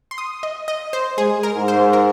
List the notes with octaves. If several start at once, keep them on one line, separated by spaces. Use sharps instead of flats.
C6
D#6
D#5
D#5
C5
G#3 G#4
A#4
G#2
C5
A#4